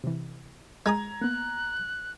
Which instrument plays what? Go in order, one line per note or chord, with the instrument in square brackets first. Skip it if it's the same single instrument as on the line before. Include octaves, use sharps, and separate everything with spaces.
[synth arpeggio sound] C3 E3
[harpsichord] G#3 G#5 D#6 [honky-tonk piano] A#5 G#6
[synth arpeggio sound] A#3 B3 [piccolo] F#6